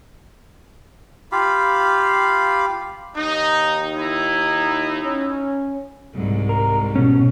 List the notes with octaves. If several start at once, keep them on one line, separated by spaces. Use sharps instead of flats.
F4 G4 F5 B5
D#2 D#4
D#4 E4
C#4
C2 G#2
A#4
B2 C#4